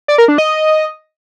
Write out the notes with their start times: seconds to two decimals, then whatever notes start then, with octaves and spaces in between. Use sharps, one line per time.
0.08 D5
0.18 A#4
0.28 D4
0.38 D#5